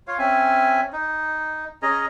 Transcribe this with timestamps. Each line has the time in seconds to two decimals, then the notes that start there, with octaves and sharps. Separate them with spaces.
0.08 F4 C#5 F5
0.19 C4 C#4 E5 G#5
0.93 D#4
1.83 C#4 G#4 D#5 A#5